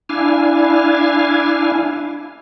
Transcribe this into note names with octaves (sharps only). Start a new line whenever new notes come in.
D4 E4 F5 G#5